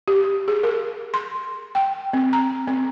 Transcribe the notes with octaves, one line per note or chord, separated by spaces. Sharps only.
G4
G#4
A#4
C6
G5
C4
A#5
C4